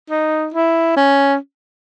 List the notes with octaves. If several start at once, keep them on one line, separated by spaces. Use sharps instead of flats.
D#4
E4
C#4